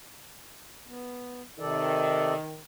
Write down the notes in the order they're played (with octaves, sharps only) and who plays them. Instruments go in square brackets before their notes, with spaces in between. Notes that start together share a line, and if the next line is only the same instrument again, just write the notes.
[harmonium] B3
[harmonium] C3 A4 D5 [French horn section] D#3